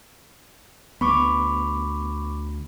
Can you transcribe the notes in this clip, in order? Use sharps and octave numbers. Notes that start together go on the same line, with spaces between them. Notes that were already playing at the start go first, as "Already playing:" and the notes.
D2 B3 B5 C#6 D6